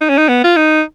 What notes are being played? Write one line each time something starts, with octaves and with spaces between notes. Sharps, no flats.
D#4
C#4
D#4
B3
F4
D#4